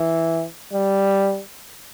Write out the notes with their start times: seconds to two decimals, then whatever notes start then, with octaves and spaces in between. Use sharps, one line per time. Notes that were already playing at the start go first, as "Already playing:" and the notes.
Already playing: E3
0.73 G3